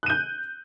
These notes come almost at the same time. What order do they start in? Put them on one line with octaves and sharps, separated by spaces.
F#6 D#7 G6